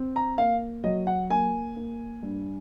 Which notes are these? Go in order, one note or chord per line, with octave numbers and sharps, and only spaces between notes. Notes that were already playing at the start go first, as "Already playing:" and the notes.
Already playing: C4
A#5
A#3 F5
F#3 D#5
F#5
A#3 G#5
A#3
G2